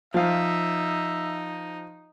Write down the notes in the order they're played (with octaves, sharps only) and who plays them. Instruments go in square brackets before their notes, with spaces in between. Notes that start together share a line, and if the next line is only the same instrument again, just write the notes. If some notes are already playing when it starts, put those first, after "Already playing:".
[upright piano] F3 F5 [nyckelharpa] D#4 [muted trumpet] E5